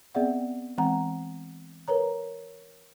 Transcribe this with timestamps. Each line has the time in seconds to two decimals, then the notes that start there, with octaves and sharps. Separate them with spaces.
0.15 B3 C4 G#4 D5 E5 F#5
0.78 E3 G#3 C4 F#5 A#5
1.88 A#4 B4 C#5 A#5